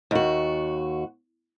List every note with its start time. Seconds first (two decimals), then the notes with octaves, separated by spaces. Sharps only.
0.11 D#2 F#4